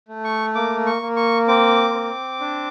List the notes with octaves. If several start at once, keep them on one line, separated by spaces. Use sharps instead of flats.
A3
C#6
A#3 D6
C#6
A#3
C#6
C4 D6
C4
D4